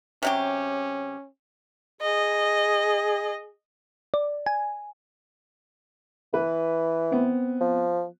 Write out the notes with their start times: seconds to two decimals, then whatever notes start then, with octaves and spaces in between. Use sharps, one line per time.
0.23 C3 F#3 C#4 G4
2.01 G#4 D#5
4.14 D5
4.46 G#5
6.34 E3 B4
7.11 B3 C4
7.61 F3